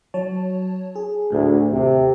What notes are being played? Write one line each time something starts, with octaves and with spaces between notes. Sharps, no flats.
F#3 C#5 A5
G#4
D2 A2
D#2 C3